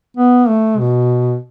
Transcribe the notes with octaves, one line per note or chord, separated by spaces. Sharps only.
B3
A3
B2